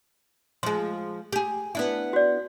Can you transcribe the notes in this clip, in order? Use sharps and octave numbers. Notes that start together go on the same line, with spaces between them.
F3 G#3 C6
G4 G#4
B3 D4 E4
F#4 D5